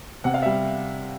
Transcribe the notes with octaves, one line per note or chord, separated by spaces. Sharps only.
C3 F#5
F5
G3 E5